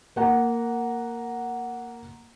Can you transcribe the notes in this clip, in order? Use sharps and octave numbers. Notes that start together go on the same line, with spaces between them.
A#3 F#5 A#5